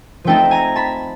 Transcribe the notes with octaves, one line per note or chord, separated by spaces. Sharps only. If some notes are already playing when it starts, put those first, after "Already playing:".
F3 A3 C4 D#4 G5 A5
G#5 A#5
A5 B5